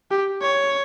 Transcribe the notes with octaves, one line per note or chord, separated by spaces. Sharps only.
G4
C#5